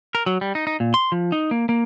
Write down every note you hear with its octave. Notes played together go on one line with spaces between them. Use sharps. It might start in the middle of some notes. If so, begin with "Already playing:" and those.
A#4
F#3
G3
D#4
D#4
A#2
C6
F3
D#4
A#3
A#3